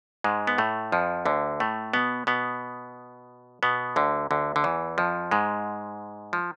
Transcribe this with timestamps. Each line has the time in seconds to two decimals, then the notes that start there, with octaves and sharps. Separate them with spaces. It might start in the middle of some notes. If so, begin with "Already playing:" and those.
0.24 G#2 G#3
0.47 B3
0.58 A2 A3
0.92 F2 F3
1.26 D2 D3
1.60 A2 A3
1.93 B2 B3
2.27 B2 B3
3.63 B2 B3
3.96 D2 D3
4.31 D2 D3
4.56 D3
4.64 E2 E3
4.98 F2 F3
5.31 G#2 G#3
6.33 F3